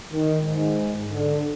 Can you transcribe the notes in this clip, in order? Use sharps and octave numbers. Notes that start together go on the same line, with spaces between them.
D#3
G#2
D3